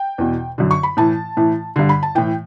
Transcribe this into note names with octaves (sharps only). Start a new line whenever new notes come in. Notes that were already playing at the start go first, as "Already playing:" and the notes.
Already playing: G5
E2 B2
F#2 D3
C#6
B5
A2 E3 A5
A2 E3
G2 D3
B5
A5
A2 E3 G5